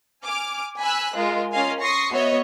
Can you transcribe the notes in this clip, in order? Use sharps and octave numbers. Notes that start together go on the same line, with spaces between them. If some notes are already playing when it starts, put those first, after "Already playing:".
G#5 D6 F6
G#5 B5 E6 F#6
G#3 F4 A#4
C#4 F4 A#4 D#5 F5 G#5
C6 C#6 D#6 A#6 C7
B3 F#4 C#5 D#5 E5